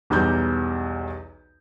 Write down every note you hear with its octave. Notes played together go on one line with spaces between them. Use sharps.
B1 E2 G3 A#5 G6